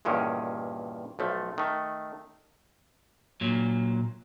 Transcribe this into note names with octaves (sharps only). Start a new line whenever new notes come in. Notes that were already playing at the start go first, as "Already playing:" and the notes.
E2 G2 A#2 D#3 C#4
B1 F3 A3
D#3 A3
A#2 F#3